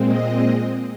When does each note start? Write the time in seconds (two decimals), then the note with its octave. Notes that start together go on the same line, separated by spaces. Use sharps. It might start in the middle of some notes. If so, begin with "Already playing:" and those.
Already playing: A#2 G#3 C4
0.08 D#5